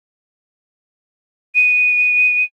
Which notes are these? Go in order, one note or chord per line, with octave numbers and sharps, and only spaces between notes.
D#7